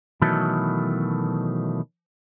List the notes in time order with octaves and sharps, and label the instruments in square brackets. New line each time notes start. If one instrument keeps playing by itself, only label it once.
[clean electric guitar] B2 D#3 E3 F#3 A3 A4